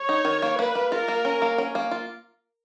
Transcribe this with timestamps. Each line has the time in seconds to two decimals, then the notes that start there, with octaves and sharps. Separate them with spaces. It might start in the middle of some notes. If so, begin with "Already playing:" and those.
Already playing: C#5
0.09 D#4
0.25 D#3
0.42 A#3
0.59 A#3 B4
0.75 A#3
0.92 F4 A#4
1.08 A#3
1.25 C#4
1.42 A#3
1.58 C#4
1.75 A#3
1.91 F4